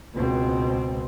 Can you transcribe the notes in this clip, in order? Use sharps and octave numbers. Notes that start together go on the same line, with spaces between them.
C#2 B2 C4